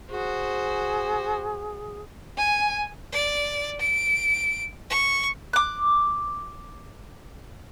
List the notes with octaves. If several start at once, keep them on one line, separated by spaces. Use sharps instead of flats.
F#4 G#4 C5
G#5
D5
D7
C#6
D6 F#6